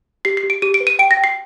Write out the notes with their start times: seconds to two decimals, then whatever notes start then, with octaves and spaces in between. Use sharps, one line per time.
0.25 G4 C7
0.37 C7
0.43 G4
0.50 D7
0.62 G4 D#7
0.74 D7
0.80 B4
0.87 D#7
0.99 G5 D7
1.11 A#6
1.17 G5
1.24 C7